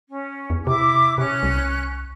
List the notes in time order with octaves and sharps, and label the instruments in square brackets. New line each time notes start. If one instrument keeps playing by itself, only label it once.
[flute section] C#4
[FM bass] E2
[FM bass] C3 [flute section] E4 D6
[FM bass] C3 [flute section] C#4 F#6
[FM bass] C2